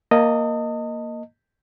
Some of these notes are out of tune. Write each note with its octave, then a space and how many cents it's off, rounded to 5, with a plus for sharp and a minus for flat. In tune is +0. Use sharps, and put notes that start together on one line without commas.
A#3 +0 D#5 +0 A5 +40